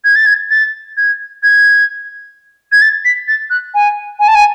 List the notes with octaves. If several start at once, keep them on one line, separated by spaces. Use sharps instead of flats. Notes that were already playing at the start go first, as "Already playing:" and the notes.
G#6
A6
G#6
A6
G#6
G#6
G#6
A6
B6
A6
F#6
G#5
G#5
A5
G#5